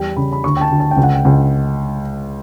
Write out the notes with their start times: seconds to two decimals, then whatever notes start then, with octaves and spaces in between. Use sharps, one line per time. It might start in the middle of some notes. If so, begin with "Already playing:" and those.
Already playing: E2 G3 G5
0.17 C#3 B5
0.33 B5
0.44 D2 C#6
0.57 G5
0.61 A5
0.71 D2
0.80 A5
0.91 G5
0.97 C#2
1.03 F#5
1.15 G5
1.25 C#2